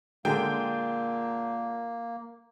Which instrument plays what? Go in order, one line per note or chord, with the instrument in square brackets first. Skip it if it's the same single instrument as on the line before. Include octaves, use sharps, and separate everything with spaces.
[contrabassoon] A#2 [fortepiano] D3 G#3 [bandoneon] A#3 [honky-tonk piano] G5